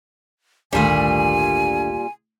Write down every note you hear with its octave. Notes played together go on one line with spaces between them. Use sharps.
G#1 D2 A#2 D#3 G3 A3 D4 G#5